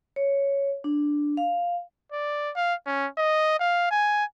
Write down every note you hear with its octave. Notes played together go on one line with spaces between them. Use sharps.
C#5
D4
F5
D5
F5
C#4
D#5
F5
G#5